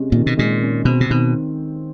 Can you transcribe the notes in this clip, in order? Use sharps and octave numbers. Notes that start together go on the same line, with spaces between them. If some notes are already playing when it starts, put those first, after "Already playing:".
Already playing: C3 G#3 C#4
A#2 D#3
B2
A#2 G#3
C#4
B2 C4
C3
B2 D#3